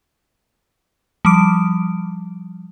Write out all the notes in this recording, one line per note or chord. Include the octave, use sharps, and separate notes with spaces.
F3 G3 D6 D7